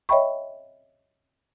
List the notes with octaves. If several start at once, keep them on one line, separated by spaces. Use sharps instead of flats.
C#5 D#5 E5 G5 B5 C#6